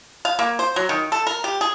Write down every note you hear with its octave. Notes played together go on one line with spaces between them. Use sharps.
F5
A#3
C5
F#3
D#3
A4
A#4
G4
G#4